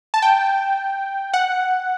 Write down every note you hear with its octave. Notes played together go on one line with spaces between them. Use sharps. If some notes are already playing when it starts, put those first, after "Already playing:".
A5
G5
F#5